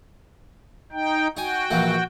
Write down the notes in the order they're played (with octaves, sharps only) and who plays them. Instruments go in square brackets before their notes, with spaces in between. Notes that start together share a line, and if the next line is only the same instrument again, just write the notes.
[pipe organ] D#4 G5
[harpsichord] D#4 G#5 [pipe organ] F#4 G5
[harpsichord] A#1 E3 A#3